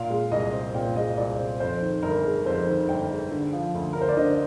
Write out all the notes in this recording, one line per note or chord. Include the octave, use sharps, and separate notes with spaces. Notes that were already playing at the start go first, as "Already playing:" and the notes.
Already playing: A#2 F5
G#3
C2 D#5
C4
A#2 G5
G#3 D#5
C2 D5
C4
F2 C5
D#3
G1 A#4
G#3
F2 C5
D#3
G1 G5
G#3
D3
F3
D2
D2 A#4
C5
D5
D3 D#5